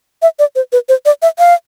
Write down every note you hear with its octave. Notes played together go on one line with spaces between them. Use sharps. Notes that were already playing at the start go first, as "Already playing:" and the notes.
E5
D5
C5
B4
C5
D5
E5
F5